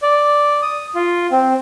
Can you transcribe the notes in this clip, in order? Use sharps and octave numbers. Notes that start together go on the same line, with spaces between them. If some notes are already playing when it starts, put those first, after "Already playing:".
D5
D#6
F4
C4